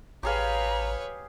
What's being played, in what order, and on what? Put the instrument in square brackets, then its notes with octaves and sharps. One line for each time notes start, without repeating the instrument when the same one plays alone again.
[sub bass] A1 [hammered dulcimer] G4 G#4 F5 [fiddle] B4 C#5 [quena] A#5